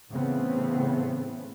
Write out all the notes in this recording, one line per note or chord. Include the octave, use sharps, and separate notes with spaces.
A2 C#3 E3 A3 B3 C4